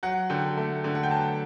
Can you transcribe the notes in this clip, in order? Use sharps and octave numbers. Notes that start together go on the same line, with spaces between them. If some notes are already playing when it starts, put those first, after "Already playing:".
F#3 F#5
D3 G5
A3
D3
F#5
G5
F#3 A5